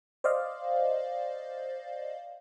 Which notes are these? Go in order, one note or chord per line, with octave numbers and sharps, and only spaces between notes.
C5 D5 D#5 F5